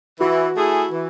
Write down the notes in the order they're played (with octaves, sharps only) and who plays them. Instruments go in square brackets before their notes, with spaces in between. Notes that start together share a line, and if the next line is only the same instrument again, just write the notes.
[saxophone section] E3 [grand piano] F#4
[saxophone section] A3 E4 G#4
E3